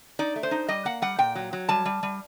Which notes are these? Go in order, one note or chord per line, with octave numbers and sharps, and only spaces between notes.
D#4 D5
A3
C5
D#4
G3 D#5
A#3 F#5
G3 F#5
A#2 G5
F#3
F#3
G3 A5
G3
G3